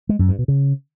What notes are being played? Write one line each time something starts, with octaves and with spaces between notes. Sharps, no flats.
G#3
F#2
G2
B2
C#3